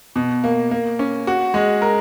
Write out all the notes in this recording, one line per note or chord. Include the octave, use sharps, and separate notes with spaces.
B2
A#3
A#3
C#4
F#4
G#3
A#4